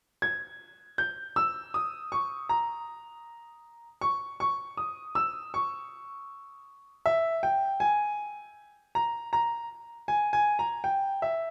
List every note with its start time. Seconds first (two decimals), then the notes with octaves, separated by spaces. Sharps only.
0.22 G#6
0.98 G6
1.36 E6
1.74 D#6
2.12 C#6
2.49 A#5
4.01 C#6
4.40 C#6
4.77 D#6
5.15 E6
5.54 C#6
7.06 E5
7.43 G5
7.80 G#5
8.95 A#5
9.33 A#5
10.08 G#5
10.33 G#5
10.59 A#5
10.84 G5
11.22 E5